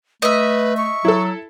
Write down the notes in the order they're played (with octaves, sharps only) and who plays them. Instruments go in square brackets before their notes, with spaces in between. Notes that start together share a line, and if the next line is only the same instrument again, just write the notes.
[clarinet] A3 [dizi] B4 [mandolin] D#5 E5
[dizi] C#6
[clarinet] F#3 [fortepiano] E4 A4